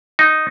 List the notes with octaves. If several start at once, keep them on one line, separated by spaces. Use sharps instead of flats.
D#4